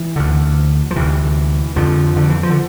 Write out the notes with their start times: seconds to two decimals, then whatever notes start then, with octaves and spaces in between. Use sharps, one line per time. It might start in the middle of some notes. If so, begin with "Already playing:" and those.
Already playing: E3
0.16 D2 D3
0.91 F3
0.96 D2 C3 E3
1.76 F2 D3 F3
2.17 D3
2.30 E3
2.43 F3
2.50 D3